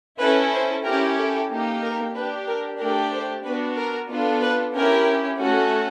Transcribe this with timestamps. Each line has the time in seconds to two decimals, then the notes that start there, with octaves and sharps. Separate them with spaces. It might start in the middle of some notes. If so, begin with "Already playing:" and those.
0.19 C#4 E4 A4 B4
0.52 C5
0.84 C#4 E4 G4 A#4
1.17 A4
1.49 A#3 D#4 G4
1.82 A#4
2.14 D4 G4 B4
2.47 A#4
2.79 A3 D4 G4 A#4
3.12 C5
3.43 B3 D4 F#4 B4
3.76 A#4
4.08 B3 D4 F4 A4
4.41 B4
4.73 C#4 E4 G4 A#4
5.39 A3 C#4 F#4 A4